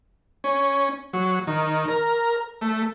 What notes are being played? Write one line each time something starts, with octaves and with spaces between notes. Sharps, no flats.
C#4
F#3
D#3
A#4
A3